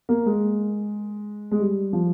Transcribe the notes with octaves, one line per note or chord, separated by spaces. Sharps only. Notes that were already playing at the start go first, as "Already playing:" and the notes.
A#3
G#3
G#3
G3
F3